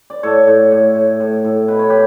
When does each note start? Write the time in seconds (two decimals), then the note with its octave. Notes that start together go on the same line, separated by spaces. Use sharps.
0.10 D5
0.23 A2 A4 C#5
0.47 A2
0.71 A2
0.95 A2
1.20 A2
1.44 A2
1.68 B2 B4
1.79 C#5
1.90 G4 B4